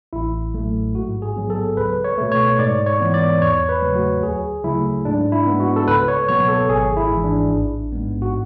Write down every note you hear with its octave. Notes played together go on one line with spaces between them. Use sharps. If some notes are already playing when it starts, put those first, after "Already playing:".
A1 E4
A2 F#3 A3
G#2 F#4
G#4
F#3 B3
A4
C#2 B4
C#5
B2 A3
C#5
G#2 D5
C#5
E3 B3
D5
E2 C#5
B4
C#3 F#3 A3
F#4
D2 G#4
C#3 F#3 A3 E4
G#2 D4
E4
G#3 B3
F#4
A4
C#2 B4
C#5
B2 F#3 B3 C#5
A4
G#1 G#4
E4
G#2 E3
D4
A1
G#2 G#3 B3
F#4